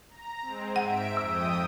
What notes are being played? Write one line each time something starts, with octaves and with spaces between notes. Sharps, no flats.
A#5
G#3 C4
G#2 E5 F#5 D7
F2 G5 D#6 E6